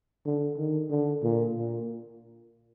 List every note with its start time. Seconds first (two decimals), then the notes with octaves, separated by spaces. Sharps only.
0.25 D3
0.58 D#3
0.90 D3
1.23 A#2
1.55 A#2